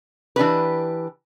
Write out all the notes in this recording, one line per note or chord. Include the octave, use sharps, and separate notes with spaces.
E3 D4 G4 B4